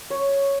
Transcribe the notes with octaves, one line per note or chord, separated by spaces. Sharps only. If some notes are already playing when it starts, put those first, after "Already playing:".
C#5